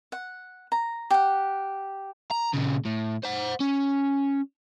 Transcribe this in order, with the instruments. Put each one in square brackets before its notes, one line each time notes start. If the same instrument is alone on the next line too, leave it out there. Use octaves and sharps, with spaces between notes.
[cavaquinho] F#5
A#5
G4 F#5
[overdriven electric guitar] A#5
A#2 C#3
A2
C5 F#5
C#4